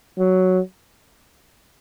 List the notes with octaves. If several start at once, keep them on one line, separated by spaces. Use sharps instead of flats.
F#3